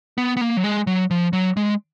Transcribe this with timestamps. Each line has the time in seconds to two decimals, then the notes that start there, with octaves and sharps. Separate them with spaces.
0.18 B3
0.37 B3
0.41 A#3
0.57 F#3
0.64 G#3
0.87 F#3
1.11 F3
1.33 F#3
1.57 G#3